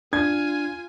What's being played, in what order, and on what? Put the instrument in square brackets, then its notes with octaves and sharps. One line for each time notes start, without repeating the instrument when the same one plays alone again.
[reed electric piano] D4 [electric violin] F4 G#5 [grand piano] G#6